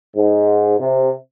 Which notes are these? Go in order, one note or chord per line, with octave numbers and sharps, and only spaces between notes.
G#2
C3